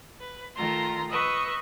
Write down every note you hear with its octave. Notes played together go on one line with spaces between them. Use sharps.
B4
D#3 A3 F4 A#5 C6
B4 D#5 C#6 E6